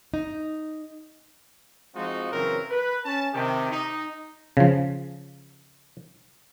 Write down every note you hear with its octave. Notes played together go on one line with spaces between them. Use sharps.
D#4
F3 G#3 C4 D#4 F4 F#4
F#2 C#3 E3 F#3 C4 A#4
B4
C#4 A5
C3 D#3 G4
D#4
C#3 F3